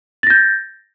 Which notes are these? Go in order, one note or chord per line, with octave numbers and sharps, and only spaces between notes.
G6 A6 A#6